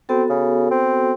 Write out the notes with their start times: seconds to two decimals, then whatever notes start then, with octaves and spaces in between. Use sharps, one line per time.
0.09 B3 C4 F#4 A4
0.29 C#3
0.71 C4